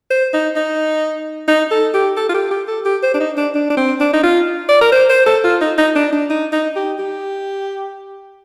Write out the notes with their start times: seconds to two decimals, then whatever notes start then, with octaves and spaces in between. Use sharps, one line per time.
0.10 C5
0.33 D#4
0.56 D#4
1.48 D#4
1.71 A4
1.94 G4
2.17 A4
2.29 F4
2.34 G4
2.51 G4
2.68 A4
2.85 G4
3.03 C5
3.14 D4
3.20 D#4
3.37 D4
3.55 D4
3.70 D4
3.77 C4
4.00 D4
4.13 D#4
4.23 F4
4.69 D5
4.81 A#4
4.92 C5
5.09 C5
5.26 A4
5.44 F4
5.61 D#4
5.78 D#4
5.95 D4
6.12 D4
6.30 D#4
6.53 D#4
6.76 G4
6.99 G4